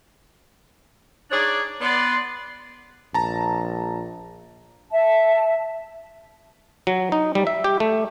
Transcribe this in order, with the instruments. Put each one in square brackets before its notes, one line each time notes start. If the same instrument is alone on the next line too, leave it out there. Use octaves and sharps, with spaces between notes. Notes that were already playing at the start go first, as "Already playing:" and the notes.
[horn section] D4 D#4 G#4 C#5 D5
B3 D5 C6
[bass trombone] A#1 [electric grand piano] A5 A#5
[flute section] E5 A5
[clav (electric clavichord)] F#3
D#4
G3
E5
G4
A3